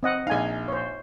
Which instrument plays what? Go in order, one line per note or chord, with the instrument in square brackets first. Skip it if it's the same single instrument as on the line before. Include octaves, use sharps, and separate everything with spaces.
[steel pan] C4 D#5 F#5
[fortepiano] A#1 F5 [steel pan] D#4 G#5
[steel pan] C5 C#5